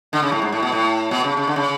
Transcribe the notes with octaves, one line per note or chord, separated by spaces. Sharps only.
D3
C#3
A2
G#2
A2
B2
A2
B2
C#3
C#3
D3
C#3